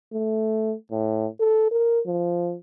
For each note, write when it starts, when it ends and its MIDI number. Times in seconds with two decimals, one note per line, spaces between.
0.13 0.75 57
0.92 1.27 45
1.40 1.70 69
1.71 2.00 70
2.07 2.55 53